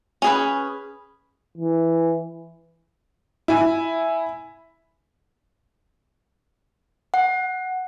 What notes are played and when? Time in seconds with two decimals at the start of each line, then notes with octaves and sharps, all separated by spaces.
0.22 C#4 G#4 B4
1.58 E3
3.48 E4 G#5
7.14 F#5